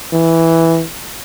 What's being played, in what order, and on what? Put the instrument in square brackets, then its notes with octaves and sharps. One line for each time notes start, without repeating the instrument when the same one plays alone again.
[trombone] E3